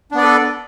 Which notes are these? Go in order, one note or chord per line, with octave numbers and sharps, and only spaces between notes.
B3 D4 A4 B4 D5